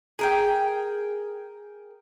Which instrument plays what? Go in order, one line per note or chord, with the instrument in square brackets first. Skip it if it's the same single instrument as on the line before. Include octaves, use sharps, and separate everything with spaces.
[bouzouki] G#4 A#4 G5